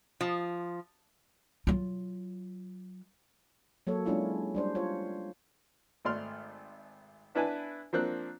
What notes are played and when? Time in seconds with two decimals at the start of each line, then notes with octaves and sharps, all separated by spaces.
0.21 F3
1.67 F#3 F4
3.87 F#3 A#3 A4 C#5
4.06 G#3 A#3 C#4 D4 E4 F4
4.55 G3 D4 C5
4.75 F4 C5 C#5
6.05 G#1 A3 D5 C6 F6
7.35 B3 D4 E4 B4 G#5 A5
7.93 F3 A#3 C4 D4 F#6